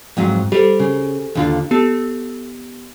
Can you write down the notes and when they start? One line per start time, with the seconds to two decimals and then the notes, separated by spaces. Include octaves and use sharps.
0.17 F2 G#2 F#3
0.52 G3 G4 A4 C5
0.80 C#3
1.35 D#2 D3 F4
1.71 B3 G4 A4